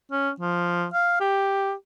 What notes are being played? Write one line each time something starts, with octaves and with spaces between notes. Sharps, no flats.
C#4
F3
F5
G4